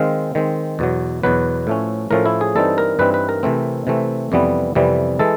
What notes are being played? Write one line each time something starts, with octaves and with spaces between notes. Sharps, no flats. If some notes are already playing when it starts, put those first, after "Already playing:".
Already playing: D#3 G#3 C4 F5
D#3 G#3 C4
E2 B2 F#3
E2 B2 F#3 B4
A2 F3 A3 C#4
A2 F3 A3 C#4 A#4
E4
G#4
G2 E3 G3 C4 D#4 A4
A#4
G2 E3 G3 C4 D#4 B4
B4
A#4
C3 E3 A3 C4
C3 E3 A3 C4
F2 C3 E3 G3 B3
F2 C3 E3 G3 B3
E3 G#3 A4